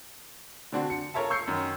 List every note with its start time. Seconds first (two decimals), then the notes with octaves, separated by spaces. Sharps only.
0.72 D3 C4 D4 F#4
0.90 C#7
1.14 F4 A4 A#4 C#5 E5 A5
1.30 C#6 E6 G6 C7 C#7
1.48 F#2 D#3